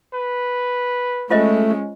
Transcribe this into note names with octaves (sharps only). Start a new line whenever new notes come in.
B4
G#3 A3 C#4 F4 C5 D#5